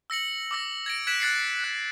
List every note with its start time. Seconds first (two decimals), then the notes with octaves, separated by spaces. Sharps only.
0.10 E6 A#6 C#7 F#7
0.51 D6 E6 A#6
0.86 G#6 A#6 D7
1.07 F#6 G#6 B6 D7 E7 F#7
1.20 F#6 A6 C7 C#7
1.64 F#6